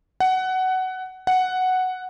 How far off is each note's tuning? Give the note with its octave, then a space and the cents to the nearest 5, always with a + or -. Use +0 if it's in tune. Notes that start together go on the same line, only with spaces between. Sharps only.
F#5 +15
F#5 +0